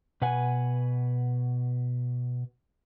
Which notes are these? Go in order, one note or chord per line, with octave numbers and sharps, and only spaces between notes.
B2 B4 F#5 G#5